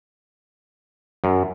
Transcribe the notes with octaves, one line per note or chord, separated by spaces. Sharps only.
F#2